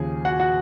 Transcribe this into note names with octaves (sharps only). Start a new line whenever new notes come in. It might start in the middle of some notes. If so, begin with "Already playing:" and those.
Already playing: D#2 C#3 F3 G#4
F#4 F#5
F#4 F#5